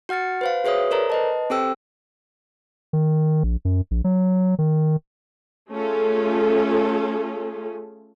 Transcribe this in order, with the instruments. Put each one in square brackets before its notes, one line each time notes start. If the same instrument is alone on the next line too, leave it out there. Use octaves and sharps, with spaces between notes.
[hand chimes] F#4 F#5 F6 A6 C#7
B4 C5 F5
F#4 G#4 B4 C#5 E5 D#6
A4 A#4 C5 D5 A#5
B4 D#5 A5
C4 G4 A4 C5 G5 E6
[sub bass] D#3
A#1
F#2
A#1
F#3
D#3
[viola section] A3 C#4 F4 G#4 A4